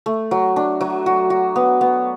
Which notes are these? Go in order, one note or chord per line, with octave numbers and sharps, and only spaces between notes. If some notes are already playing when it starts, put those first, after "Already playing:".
A3
F#3
D4
F#3
F#4
F#4
B3
B3